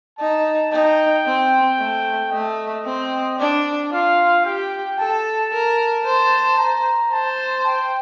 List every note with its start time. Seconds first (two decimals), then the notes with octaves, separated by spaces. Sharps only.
0.19 D#4 A5
0.72 D#4 G5
1.25 C4
1.78 A3
2.32 A3 D#5
2.85 C4
3.38 D4 D5
3.92 F4 F5
4.45 G4 G5
4.99 A4 A5
5.53 A#4
6.05 C5
6.58 A#5
7.12 C5 A5
7.65 G5